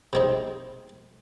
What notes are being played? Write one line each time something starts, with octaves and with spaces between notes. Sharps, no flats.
C3 G#3 C4 D#4